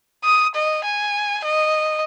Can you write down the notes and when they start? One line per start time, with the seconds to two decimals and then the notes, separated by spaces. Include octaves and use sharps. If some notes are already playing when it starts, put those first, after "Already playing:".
0.24 D#6
0.55 D#5
0.84 G#5
1.44 D#5